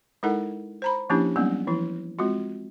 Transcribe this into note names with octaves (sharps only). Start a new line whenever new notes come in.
G#3 D#4 E4 A4 A#4 F#5
C5 A#5 B5
F3 A#3 C#4 D4 E4 G4
F#3 G3 A#3 B3 C#4 D#4
E3 F3 E4
G#3 C4 F4 F#4